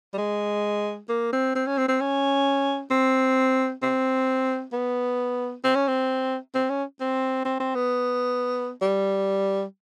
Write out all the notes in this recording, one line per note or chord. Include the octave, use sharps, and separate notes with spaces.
G3
G#3
A#3
C4
C4
C#4
C4
C4
C#4
C4
C4
B3
C4
C#4
C4
C4
C#4
C4
C4
C4
B3
G3